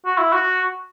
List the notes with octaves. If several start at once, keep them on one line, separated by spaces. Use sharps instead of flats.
F#4
E4
F#4